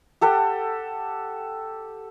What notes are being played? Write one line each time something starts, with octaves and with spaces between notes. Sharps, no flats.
G4 A4 F#5 G5